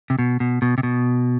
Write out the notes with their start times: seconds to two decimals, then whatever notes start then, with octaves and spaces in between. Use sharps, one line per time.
0.10 C3
0.19 B2
0.40 B2
0.62 B2
0.78 C3
0.83 B2